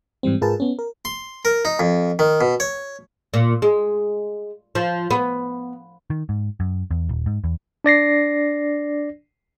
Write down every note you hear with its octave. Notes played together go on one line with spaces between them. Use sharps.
G#2 E3 G3 C4
G#2 F4 G#4 A#4 B4 A5
B3 C#4
A#4
C6
A#4
D#4
F2
D#3
B2
C#5
A#2
G#3
F3
B3
D#3
G#2
F#2
E2
D#1
G#2
E2
D4 D5 A#6 C7